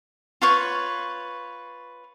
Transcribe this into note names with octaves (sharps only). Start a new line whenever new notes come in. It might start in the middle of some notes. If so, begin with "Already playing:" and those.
F4 B4 C#5